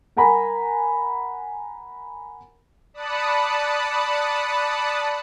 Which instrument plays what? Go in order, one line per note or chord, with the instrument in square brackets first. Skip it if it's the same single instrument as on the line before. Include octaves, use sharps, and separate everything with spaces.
[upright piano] A#4 F#5 G#5 A#5 B5
[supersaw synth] D5 A5 B5 D#6 F#6 C#7